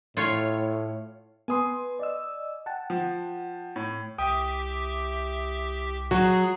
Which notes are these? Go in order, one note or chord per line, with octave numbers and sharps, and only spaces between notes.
A2 F4 C#5
B3 B4 G#5 C6 D#6
D5 D#5 E6
F#5 G5 A5
F3
A2
C2 G4 E5 G5 D#6
F#3 F#4 G#4